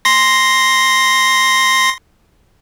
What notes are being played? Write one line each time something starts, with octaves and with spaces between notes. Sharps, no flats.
C6 A#6